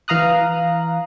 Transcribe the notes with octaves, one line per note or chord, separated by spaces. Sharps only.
E3 F5 A#5 D#6 F#6